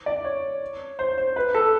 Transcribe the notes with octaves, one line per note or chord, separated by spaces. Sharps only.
D5
C#5
C5
C5
B4
A4